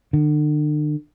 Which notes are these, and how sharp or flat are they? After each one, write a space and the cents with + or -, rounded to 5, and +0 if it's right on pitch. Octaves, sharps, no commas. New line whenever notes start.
D3 +40